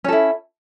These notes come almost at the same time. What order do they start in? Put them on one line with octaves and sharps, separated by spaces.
C#4 A4 E4